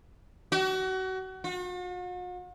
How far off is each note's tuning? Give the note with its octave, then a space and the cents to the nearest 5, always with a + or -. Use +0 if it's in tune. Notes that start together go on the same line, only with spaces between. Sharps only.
F#4 +30
F#4 -45